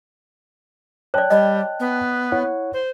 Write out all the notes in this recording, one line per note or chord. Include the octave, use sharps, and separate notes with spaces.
C#5 D5 G5 A5 F#6
G3 D#5
B3
E4 C#5 F#5
C5